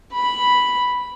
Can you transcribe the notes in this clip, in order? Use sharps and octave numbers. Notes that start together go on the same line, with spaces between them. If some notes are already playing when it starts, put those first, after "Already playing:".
B5